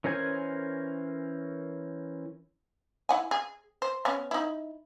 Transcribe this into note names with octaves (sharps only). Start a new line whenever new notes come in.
E3 C#4 A#4 C5 G#5
E4 F#5 G#5
G#4
C5
B3 C#4
D#4 E4